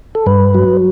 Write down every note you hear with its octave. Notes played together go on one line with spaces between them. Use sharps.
A4
G2 B4
F#3